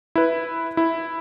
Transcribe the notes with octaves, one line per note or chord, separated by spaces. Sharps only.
E4 B4
E4